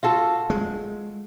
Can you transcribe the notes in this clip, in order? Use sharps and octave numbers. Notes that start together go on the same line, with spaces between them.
F4 F#4 A4
G#3